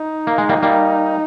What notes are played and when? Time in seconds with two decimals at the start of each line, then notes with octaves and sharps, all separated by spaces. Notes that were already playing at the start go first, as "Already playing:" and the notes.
Already playing: D#4
0.27 A#3
0.38 G#3
0.49 G3 A#3
0.63 G3 A#3